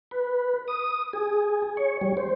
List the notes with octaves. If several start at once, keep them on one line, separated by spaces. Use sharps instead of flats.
B4
D#6
G#4
C#5
G3
C5